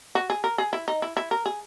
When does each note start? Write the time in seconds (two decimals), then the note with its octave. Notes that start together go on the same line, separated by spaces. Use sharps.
0.15 F#4
0.30 G#4
0.44 A#4
0.58 G#4
0.73 E4
0.88 D#4
1.02 E4
1.17 E4
1.31 A#4
1.46 G#4